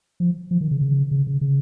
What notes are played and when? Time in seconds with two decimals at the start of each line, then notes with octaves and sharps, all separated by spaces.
0.20 F3
0.51 F3
0.61 D#3
0.71 C#3
0.81 C#3
1.11 C#3
1.27 C#3
1.41 C#3